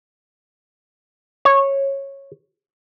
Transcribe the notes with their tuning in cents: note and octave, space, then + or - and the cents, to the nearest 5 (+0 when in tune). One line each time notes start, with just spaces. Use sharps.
C#5 -15